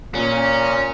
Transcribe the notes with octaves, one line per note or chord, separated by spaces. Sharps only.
A#2 C#4